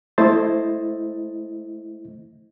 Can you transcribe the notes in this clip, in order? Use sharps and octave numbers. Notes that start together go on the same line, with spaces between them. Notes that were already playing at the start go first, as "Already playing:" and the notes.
A3 E4 C5 D#5 A6